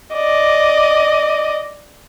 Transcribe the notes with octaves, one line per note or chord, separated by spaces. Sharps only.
D5 D#5